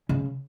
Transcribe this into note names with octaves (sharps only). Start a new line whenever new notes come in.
C#3